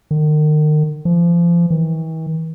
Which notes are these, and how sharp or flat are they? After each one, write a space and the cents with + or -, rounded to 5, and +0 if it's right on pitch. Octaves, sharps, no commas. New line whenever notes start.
D#3 -35
F3 -30
E3 -45